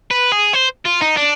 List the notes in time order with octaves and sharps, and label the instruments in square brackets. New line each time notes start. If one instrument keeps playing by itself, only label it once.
[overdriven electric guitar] B4
G#4
C5
F4
D#4
D4